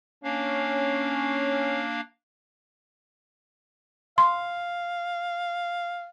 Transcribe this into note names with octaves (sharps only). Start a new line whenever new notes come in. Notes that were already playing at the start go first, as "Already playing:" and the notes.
A#3 C#4 D4 F5
F5 C6